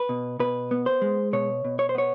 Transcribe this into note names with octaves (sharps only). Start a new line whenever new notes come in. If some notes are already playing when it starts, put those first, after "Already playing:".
Already playing: B4
B2
B2 B4
B3
C5
G#3
B2 C#5
B2
C#5
C5
B3 C#5